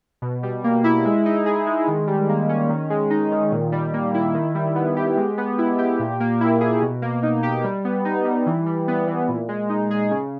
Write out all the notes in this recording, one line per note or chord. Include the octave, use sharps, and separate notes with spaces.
B2
G3
A#3
E4
G#3
D#4
G#4
G#3
D#3
G3
A#3
C#4
D#3
G#3
D#4
D#3
A#2
G3
A#3
E4
D#3
G3
B3
G4
G#3
B3
E4
G4
A#2
A#3
E4
G#4
B2
A#3
D#4
G4
G3
B3
D#4
G3
E3
G3
B3
E3
A#2
G#3
D#4
G#4
C#3